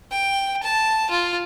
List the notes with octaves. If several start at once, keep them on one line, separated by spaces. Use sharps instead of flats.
G5
A5
F4